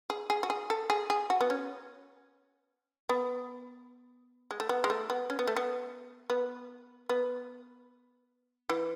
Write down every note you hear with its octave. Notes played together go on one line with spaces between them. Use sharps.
G#4
G#4
F#4
G#4
A4
G#4
G#4
F#4
B3
C#4
B3
G#3
A3
B3
G#3
A3
B3
C#4
B3
A3
B3
B3
B3
E3